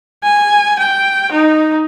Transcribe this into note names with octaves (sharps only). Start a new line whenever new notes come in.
G#5
G5
D#4